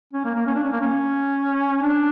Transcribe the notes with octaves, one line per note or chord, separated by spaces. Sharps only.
C#4
A#3
A#3
C#4
D4
C#4
A#3
C#4
D4